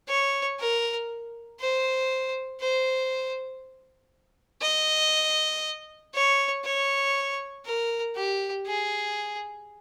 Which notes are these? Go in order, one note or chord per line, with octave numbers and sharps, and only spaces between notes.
C#5
A#4
C5
C5
D#5
C#5
C#5
A#4
G4
G#4